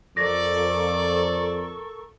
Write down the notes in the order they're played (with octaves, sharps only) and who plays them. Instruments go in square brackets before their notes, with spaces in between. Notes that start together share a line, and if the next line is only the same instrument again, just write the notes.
[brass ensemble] F2 [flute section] A4 A#4 C#6 [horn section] D5 [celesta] A#6